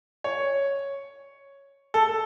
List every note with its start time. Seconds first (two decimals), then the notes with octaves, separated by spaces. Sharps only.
0.24 C#5
1.94 A4